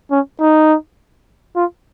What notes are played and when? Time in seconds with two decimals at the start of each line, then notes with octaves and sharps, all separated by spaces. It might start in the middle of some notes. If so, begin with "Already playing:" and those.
0.11 C#4
0.40 D#4
1.56 F4